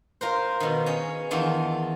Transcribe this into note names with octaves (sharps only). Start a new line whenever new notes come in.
F4 A#4 C5
B2 D#3
C#4 G#4
E2 D#3 F4 A5